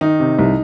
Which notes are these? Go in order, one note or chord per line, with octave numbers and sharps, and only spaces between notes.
D#3 D#4
C3
C2